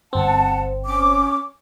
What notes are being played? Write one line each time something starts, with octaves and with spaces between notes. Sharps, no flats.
G1 C4 F#5 A5
C#4 D6